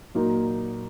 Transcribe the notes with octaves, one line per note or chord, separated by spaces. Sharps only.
A#2 F#3 A#3 D#4